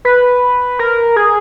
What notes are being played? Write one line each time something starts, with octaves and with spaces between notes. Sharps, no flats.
B4
A#4
G#4